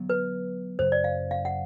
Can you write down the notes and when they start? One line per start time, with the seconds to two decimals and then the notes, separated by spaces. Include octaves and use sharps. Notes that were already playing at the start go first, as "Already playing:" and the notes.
Already playing: D3 F#3 B3
0.10 B4
0.79 F#2 C#3 F#3 C5
0.92 D5
1.04 F5
1.31 F5
1.45 F#5